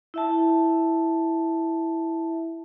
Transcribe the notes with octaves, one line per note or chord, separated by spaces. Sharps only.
E4 E5 A5